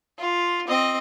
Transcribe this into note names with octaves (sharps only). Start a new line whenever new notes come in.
F4
C4 D#5